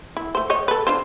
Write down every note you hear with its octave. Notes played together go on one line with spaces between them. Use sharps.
E4
A3 C5
C5 C#5 D#5
A4 B4
D4 F4 C5